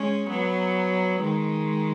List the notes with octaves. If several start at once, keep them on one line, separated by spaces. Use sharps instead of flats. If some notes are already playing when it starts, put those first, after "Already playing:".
Already playing: G#3 C#4
F#3 B3
D#3 G#3